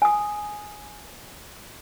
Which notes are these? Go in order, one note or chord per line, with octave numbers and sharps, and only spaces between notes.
G#5 D#6